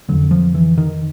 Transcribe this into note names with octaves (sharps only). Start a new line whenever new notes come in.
F2 D3 F#3
F3
E3
D#3